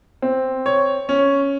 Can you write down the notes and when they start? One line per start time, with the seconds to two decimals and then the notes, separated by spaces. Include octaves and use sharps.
0.22 C4
0.66 C#5
1.09 C#4